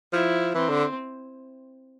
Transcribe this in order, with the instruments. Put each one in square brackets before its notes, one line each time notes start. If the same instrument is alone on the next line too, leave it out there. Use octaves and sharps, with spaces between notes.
[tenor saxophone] F3 [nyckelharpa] E4
[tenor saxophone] E3 [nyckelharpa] C4
[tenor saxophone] D3